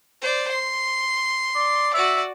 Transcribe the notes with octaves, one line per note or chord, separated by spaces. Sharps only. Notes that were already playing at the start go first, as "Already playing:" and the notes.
C5 D5
C6
D5
F#4 D5 E5